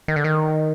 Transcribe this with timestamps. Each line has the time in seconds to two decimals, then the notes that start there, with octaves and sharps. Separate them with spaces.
0.08 D#3
0.16 D3
0.24 D#3